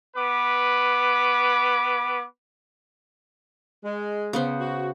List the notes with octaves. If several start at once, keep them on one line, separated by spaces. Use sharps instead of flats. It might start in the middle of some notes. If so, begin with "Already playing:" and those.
B3 B4 D6
G#3
C#3 B3 C5
F#4